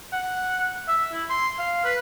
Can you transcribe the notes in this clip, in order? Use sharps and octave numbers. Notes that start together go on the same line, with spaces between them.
F#5
E5
E4
C6
F5
B4